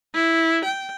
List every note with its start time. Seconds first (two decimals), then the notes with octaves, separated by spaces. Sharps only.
0.14 E4
0.65 G5